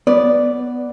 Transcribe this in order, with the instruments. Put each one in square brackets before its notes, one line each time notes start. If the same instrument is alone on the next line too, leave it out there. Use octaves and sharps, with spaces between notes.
[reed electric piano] B3 [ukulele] D5